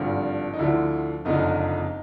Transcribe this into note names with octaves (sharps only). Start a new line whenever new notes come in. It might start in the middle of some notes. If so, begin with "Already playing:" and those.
Already playing: G#1 G2 D3 F3
D#4
D2 D3 F3 E4
F#1 F2 D3 F3 D#4